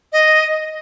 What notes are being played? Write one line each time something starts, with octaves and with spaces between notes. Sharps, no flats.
D#5